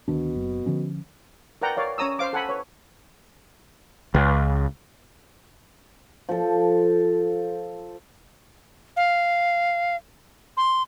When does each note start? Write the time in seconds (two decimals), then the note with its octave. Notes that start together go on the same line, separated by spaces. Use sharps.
0.08 D2 B2 D#3 D4
0.36 F#1
0.66 D3 F3 C#4
1.62 A#4 B4 D5 F#5 G5 A#5
1.77 A#4 C#5 D5 F5
1.98 C#4 C#5 A#5 D#6 E6
2.19 C5 F5 D6
2.33 A4 F#5 G#5 B5
2.49 B4 C#5
4.15 C#2
6.29 F3 A4
8.97 F5
10.57 C6